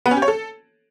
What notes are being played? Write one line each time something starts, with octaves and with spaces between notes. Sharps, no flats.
B3
C#4
G4
C#5
A4